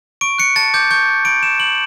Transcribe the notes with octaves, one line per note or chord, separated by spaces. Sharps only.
C#6 D7
F#6 C#7
A5 A6
D6 G6
C#6 G6
F#6
B5 D7
F#6 E7
B5 F#7